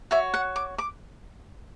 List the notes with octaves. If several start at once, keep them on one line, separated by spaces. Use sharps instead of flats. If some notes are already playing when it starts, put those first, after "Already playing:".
F#4 C#5 E5
F#5
D6
D6